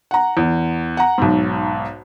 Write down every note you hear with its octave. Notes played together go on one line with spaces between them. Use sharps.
F#5 A#5
E2
F#5 A#5
B1 G#2